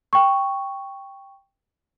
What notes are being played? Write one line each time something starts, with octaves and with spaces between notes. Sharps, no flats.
G5 C#6